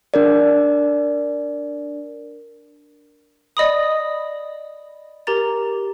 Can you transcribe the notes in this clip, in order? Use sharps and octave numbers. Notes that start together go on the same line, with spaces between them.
D4 A#4 D5
D5 D#5 B5 D#6
G4 A#4 A#5 A6